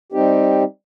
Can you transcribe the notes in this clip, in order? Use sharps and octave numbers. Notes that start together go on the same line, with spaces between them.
G3 C4 D#4 G4